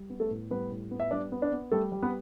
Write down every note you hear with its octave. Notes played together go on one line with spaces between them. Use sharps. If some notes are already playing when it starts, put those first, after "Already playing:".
Already playing: G3
B3
A3 A4
A2
G3 B3 B4
A2
B3
E5
G3 D4 D5
B3
D4 D5
B3
G3 A3 A4
G3
B3 B4